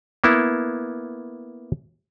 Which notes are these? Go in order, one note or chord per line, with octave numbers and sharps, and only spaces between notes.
A#3 B3 E4